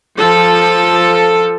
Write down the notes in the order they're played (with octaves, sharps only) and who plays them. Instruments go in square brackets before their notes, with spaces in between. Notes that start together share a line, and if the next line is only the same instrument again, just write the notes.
[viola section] F3 A4